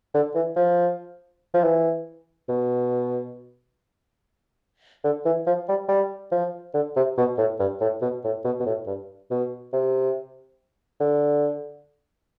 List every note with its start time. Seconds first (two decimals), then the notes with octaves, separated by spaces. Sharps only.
0.15 D3
0.35 E3
0.56 F3
1.54 F3
1.64 E3
2.49 B2
5.04 D3
5.25 E3
5.47 F3
5.69 G3
5.89 G3
6.32 F3
6.74 D3
6.96 C3
7.18 B2
7.38 A2
7.60 G2
7.81 A2
8.02 B2
8.24 A2
8.44 B2
8.60 B2
8.66 A2
8.87 G2
9.31 B2
9.73 C3
11.00 D3